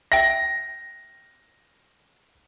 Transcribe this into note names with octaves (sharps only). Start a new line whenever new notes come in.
E5 G5 A#6